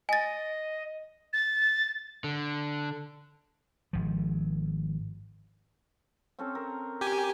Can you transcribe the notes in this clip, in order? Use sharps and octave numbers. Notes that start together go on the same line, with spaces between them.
D#5 G#5 A6
A6
D3
G#1 F3
C4 C#4 A4
A#4
G4 G#5